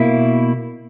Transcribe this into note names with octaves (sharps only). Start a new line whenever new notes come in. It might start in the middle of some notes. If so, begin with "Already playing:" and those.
Already playing: B2 A#3 E4